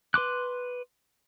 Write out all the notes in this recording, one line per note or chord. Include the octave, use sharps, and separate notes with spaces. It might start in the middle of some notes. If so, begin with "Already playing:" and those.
B4 C6 D6 F#6